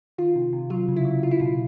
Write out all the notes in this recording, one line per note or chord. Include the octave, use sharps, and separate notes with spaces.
D#3 F4
C3
C3
F#3 F4
C#3
E4
F#3
F#3 F4
E4
B2 F4